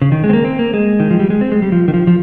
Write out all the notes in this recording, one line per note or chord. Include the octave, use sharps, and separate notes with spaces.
C#3
D#3
G#3
C4
A#3
C4
A#3
G#3
D#3
F3
G3
G#3
C4
G#3
G3
F3
D#3
F3
F3